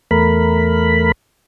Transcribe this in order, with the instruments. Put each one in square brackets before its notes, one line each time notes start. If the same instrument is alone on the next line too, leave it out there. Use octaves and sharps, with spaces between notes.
[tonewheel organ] E2 A3 A#4 B5